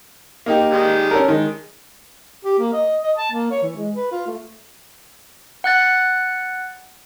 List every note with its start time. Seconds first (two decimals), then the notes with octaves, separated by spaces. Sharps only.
0.46 A#3 D#4 G4
0.71 D#3 G3 G#3
1.11 C#4 A4 A#4
1.28 D#3 G#3
2.45 G4
2.59 A#3
2.73 D#5
3.03 D#5
3.17 A5
3.32 A#3
3.51 C#5
3.63 E3
3.76 G#3
3.95 B4
4.12 F4
4.27 A3
5.64 F#5 F#6 A6